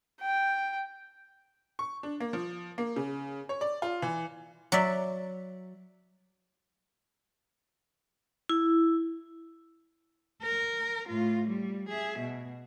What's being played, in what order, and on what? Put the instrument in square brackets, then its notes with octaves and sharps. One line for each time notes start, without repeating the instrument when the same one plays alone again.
[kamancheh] G5
[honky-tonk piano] C#6
D4
A#3
F3
A#3
C#3
C#5
D5
F4
E3
[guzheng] F#3 D5 E5
[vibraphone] E4
[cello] A#4
A2 F4
G3
G#4 E5
B2